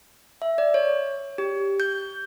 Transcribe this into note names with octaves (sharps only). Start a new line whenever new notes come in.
E5
D5
C#5
G4
G6